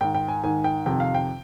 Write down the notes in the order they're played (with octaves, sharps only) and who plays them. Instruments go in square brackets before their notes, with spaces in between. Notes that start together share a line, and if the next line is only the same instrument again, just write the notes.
[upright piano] G#2 D#3 G5
G5
G#5
G#2 D#3 G#5
G5
F2 C3 D#3 G5
F5
G5